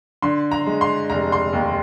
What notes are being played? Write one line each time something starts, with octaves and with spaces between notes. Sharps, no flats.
D3 C6
A#5
G#3
C6
F1 A#5
C6
D#2